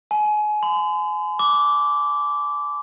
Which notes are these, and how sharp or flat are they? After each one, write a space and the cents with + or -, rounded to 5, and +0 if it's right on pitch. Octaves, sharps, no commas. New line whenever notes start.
G#5 +30
C6 -45
D6 -15